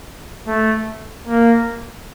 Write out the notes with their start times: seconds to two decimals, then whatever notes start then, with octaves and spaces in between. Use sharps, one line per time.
0.47 A3
1.27 A#3